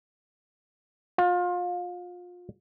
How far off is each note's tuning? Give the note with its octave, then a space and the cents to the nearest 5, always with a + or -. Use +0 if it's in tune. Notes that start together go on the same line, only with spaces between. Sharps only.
F4 +30